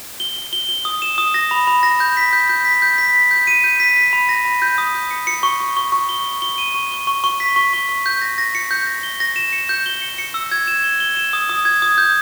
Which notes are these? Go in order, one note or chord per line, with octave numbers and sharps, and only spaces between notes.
G7
G7
G7
G7
D#6
E7
D#6
A#6
B5
B5
A#6
G6
B6
G6
G6
B6
G6
B6
B6
G6
D#7
G6
B6
B6
B5
A#6
B5
G6
D#6
G6
C#7
C#7
C#6
C#6
C#6
C#6
G7
G7
G7
D#7
C#6
C#6
C#6
C#6
B6
C#6
C#6
C#6
G6
A#6
A#6
C#7
G6
A#6
G7
A#6
E7
C#7
G6
G7
C#7
C#7
E6
G#6
E7
G7
G7
E7
D#6
D#6
G#6
D#6
G6